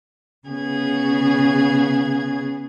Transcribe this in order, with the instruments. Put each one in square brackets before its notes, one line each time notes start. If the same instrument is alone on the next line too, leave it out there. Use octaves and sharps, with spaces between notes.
[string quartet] C#3 B3 G#4 G#6